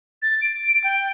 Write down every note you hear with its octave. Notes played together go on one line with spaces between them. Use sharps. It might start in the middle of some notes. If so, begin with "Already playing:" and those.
A6
D7
G5